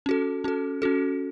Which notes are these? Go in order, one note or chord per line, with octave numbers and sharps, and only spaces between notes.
C#4 F#4 A4
C#4 F#4 A4
C#4 F#4 A4